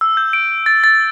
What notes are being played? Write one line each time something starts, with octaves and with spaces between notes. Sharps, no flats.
E6
G6
D7
A6
A6